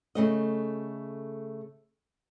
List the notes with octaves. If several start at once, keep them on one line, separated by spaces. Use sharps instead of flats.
C#3 A3 D#5